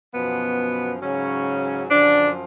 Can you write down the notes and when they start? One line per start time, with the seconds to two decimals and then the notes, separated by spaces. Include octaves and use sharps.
0.14 F#2 B2 F3 B3
1.02 G#2 C#3 F#3 C#4
1.89 F#2 D3 F3 D4